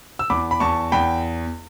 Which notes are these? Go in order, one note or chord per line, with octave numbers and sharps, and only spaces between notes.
E6
E2 B5 D6
B5
E2 A5 C#6
E2 G5 B5